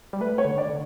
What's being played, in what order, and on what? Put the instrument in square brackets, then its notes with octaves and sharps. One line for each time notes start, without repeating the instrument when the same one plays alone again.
[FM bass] G3
[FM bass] A3 [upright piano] B4
[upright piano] C#5
[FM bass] D3
[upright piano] D5
[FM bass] D3